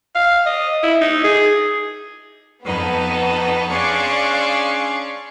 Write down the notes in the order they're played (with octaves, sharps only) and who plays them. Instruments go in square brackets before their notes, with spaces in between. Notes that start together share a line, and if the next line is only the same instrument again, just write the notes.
[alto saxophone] F5
D#5
E4
D#4
G#4
[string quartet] F2 D#4 B4 [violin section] B3 A5
[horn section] C#4 D4 [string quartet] G#4 F5 C6 [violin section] D5 C#6